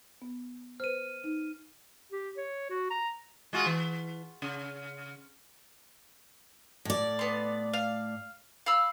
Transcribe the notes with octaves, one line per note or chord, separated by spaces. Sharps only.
B3
B4 C5 F6 D#7
D#4
G4
C#5
F#4
A#5
G#3 F4 F#4
E3
C#3
A2 D5
B3 C6
F5
F5 B5 E6